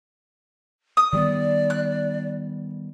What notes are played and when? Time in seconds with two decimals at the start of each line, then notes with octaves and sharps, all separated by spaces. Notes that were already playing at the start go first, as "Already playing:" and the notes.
0.97 D#6
1.13 D#3 G3 B3 D5
1.70 F#6